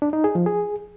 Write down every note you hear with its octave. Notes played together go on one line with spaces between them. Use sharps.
D4
D#4
G#4
F3
G#4